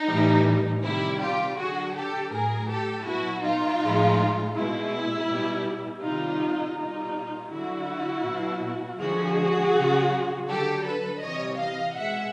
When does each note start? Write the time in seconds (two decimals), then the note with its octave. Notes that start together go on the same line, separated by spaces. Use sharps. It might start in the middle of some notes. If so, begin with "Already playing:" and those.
Already playing: D#4
0.09 A2 E3 G3
0.84 C3 D#3 G3 E4
1.21 F4 G4
1.57 D3 F#3 F#4 G#4
1.95 G4 A4
2.32 A2 F#3 G#4 A#4
2.69 G4 A4
3.06 B2 F#3 E4 F#4
3.43 D#4 F4
3.80 A2 F3 G#3
4.55 B2 G#3 E4
5.29 B2 G3
6.03 C3 D#3 G3 D#4 F4
6.77 B2 G3 D#4 F4
7.51 D3 F#3 E4 F#4
8.25 B2 F#3
9.00 D3 F3 G#3 F#4 G#4
9.74 C#3 F#3
10.49 D3 F#3 G4 A4
10.86 A4 B4
11.23 C3 E3 G3 C#5 D#5
11.60 D#5 F5
11.97 B2 G#3 E5 F#5